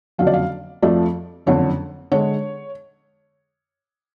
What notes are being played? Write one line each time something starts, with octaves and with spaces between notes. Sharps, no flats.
F#1 F2 D3 F#3 F5
D5
F5
F2 F3 A3 D5
F#1 F2 D3 C#5
D3 G#3 C#5